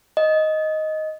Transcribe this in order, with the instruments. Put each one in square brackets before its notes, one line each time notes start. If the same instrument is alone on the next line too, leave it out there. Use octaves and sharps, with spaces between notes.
[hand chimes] D#5